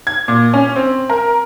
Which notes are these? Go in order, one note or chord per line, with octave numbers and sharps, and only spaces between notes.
G#6
A#2
C#4
C4
A#4